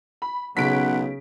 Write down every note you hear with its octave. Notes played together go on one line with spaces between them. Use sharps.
B5
B1 C#3 F#5 B6 D7